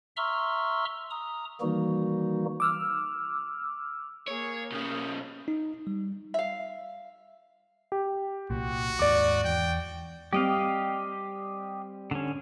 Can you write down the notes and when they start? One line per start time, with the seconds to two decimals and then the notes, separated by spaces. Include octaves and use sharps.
0.17 E5 A#5 C6 C#6 E6 F6
1.10 A#5 D#6
1.61 D#3 E3 G3 A#3 D#4 F#4
2.60 D6 E6 F6
4.28 A#3 G#4 C#5
4.72 B2 C#4 D#6 G6
5.48 D#4
5.87 G3
6.34 E5 F5
7.92 G4
8.50 C2 A#2 F#4
8.99 D#2 G#2 D5 D6
9.44 E2 G5
10.33 G3 C4 G4 D#5 F5
12.11 D3 C#4